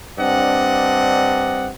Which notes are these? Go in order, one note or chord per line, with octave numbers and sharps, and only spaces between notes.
G2 C4 D4 D5 D#5 F#5